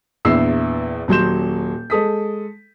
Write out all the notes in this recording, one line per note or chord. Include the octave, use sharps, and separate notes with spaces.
A#1 E2 E4 E6 C7
D#1 F#3 C6 G6 E7
G#3 A4 D#6 B6